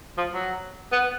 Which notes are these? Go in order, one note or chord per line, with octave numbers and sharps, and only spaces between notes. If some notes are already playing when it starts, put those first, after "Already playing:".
F3
F#3
B3